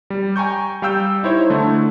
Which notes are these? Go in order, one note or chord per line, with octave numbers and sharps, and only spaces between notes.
G3
G5 G#5 A#5 C#6 G6
G3 F5 G5 E6 G6
D#4 E4 C5 C#5
D3 A3 E4